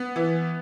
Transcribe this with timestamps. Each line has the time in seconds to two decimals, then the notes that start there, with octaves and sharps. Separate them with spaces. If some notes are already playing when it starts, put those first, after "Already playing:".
Already playing: B3
0.16 E3